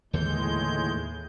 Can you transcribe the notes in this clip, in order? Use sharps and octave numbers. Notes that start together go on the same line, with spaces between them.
D#2 A2 D3 E3 G#3 G6